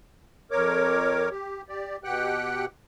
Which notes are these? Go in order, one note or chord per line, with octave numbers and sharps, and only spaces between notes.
F2 A#4 C#5 D6
G4
G4 D5
B2 G4 F#5 G5 F#6